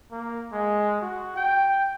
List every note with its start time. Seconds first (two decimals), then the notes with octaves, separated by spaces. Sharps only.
0.12 A#3
0.53 G#3
1.01 F#4
1.36 G5